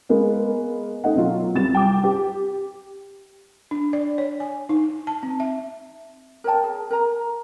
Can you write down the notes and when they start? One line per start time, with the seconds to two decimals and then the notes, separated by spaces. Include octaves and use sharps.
0.09 G#3 A#3 B3
1.04 A3 D#4 F#5
1.15 B2 F#3 F4
1.54 C2 C3 G3 A6 E7
1.75 G5 D6
2.04 G4
3.71 D4
3.93 D5
4.18 C#5
4.40 G#5
4.69 D#4
5.07 A5
5.23 C4
5.40 E5
6.44 A#4 C#5 G5 A5
6.63 G#4
6.91 A#4 A#5